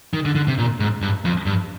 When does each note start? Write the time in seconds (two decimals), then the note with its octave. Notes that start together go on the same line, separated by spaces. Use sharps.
0.14 D#3
0.25 D3
0.36 D3
0.48 C3
0.58 A#2
0.80 G#2
1.02 G2
1.25 F2
1.46 G2